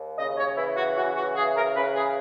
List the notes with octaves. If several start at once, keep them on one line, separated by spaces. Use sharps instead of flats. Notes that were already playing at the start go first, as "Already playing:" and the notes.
Already playing: D#2
C#3 D#5
C#5
E3 E4
F#4
C#3 F#4
F#4
E3 G#4
A#4
C#3 B4
G#4